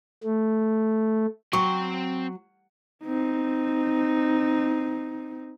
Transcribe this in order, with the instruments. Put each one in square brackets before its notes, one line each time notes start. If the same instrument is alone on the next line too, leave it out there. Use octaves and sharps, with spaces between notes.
[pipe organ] A3
[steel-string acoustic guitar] F#3 [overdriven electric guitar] C4 G5 [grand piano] C#6
[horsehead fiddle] C4 D#4